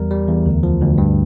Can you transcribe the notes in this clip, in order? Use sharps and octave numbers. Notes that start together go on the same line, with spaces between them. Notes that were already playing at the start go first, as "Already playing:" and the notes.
Already playing: E2 G3 A#4
G3
E2
D2
F3
D2
G2